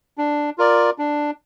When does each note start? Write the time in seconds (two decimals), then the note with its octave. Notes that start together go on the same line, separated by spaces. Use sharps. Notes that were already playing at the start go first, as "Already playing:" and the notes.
0.18 D4
0.58 F4 A#4 D5
0.99 D4